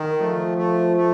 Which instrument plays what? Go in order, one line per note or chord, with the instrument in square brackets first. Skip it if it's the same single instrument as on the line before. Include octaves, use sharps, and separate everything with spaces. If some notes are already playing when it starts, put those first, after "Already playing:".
Already playing: [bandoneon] D#3
[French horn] F3 [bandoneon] A3
[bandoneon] A3
A3